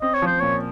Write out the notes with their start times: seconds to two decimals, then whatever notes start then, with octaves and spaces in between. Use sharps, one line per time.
0.02 C4 D#5
0.14 C#5
0.22 F3 C5
0.40 A#2 C#5